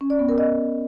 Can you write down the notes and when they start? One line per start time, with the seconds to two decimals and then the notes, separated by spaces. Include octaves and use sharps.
0.01 C#4
0.10 D5
0.19 B3
0.29 A#4
0.38 D#5